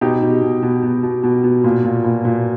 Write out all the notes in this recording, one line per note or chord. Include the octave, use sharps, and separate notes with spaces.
B2 D#4 G4
B2
B2
B2
B2
B2
B2
B2
A#2
A#2
A#2
A#2